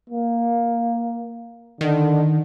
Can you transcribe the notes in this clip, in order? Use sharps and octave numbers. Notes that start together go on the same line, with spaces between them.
A#3
D3 D#3